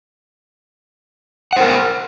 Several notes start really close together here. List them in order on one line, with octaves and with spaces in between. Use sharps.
F#5 C5 A#4